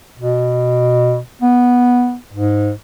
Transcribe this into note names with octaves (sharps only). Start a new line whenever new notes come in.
B2
B3
G#2